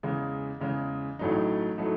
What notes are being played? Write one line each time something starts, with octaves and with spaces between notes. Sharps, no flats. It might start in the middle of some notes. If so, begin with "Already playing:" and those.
E2 C#3 G#3
E2 C#3 G#3
A1 A2 F#3 A3 D#4
A2 F#3 A3 D#4